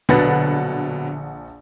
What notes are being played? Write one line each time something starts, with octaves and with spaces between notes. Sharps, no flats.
A#1 B2 D3 F#3 B3 F#5 A6